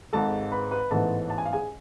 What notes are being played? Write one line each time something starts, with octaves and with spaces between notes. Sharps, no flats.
G#1 G#2 G#3 A4 A5
B4 B5
B4 B5
A1 G#2 E3 B3 A4 A5
A5
G#5
F5
G#4 G#5